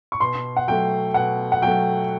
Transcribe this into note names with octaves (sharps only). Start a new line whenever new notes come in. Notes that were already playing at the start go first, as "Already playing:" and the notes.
C#6
B2 C6
F#5
F#3 A3 G5
B2 F#5
F#5
F#3 A3 G5